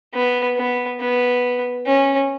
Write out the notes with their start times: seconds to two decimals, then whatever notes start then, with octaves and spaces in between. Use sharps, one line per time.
0.14 B3
0.57 B3
1.00 B3
1.87 C#4